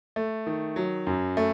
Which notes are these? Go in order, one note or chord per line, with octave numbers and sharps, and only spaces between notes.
A3
D#3
F#3
F#2
A3